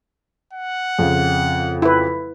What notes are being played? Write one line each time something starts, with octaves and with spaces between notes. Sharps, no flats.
F#5
F2 C#3
E4 B4